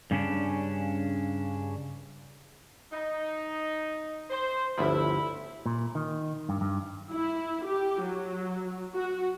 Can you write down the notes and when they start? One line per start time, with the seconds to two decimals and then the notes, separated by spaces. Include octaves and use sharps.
0.11 G2 C#3 C#4 D4
2.92 D#4
4.29 C5
4.78 G1 D2 F3 E4
5.66 A#2
5.95 D#3
6.49 G2
6.61 G2
7.11 E4
7.66 G4
8.02 F#3
8.94 F#4